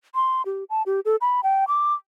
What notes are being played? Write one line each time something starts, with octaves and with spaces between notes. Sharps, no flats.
C6
G4
A5
G4
A4
B5
G5
D6